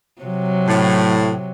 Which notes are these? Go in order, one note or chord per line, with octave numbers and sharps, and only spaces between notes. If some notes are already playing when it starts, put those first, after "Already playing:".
C3 F#3
A2